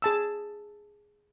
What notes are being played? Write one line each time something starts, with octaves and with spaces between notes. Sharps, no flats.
G#4 A5 E6